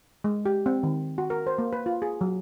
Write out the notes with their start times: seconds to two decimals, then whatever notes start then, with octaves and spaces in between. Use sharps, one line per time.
0.24 G#3
0.46 G4
0.66 C4
0.83 D#3
1.18 F#4
1.30 A#4
1.47 C5
1.58 A#3
1.73 B4
1.86 F4
2.02 G#4
2.21 F#3